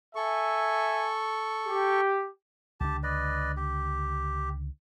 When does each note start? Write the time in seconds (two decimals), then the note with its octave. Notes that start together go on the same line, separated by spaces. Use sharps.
0.15 A4 E5 G#5 C#6
1.67 G4
2.80 C#2 D3 D4 G4 A5
3.03 B4 D5 D#5
3.57 G4